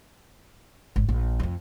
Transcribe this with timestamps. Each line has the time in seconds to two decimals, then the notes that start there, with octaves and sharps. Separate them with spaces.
0.96 G#1
1.09 A#1
1.40 F2 F3